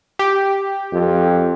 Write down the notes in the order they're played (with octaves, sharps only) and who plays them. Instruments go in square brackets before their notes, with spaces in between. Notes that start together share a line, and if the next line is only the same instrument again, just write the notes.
[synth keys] G4
[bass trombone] F2